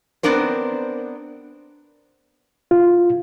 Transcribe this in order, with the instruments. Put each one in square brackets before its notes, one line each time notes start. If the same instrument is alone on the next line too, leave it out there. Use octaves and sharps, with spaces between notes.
[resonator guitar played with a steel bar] B3 C4 D4 A#4 C5
[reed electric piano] F4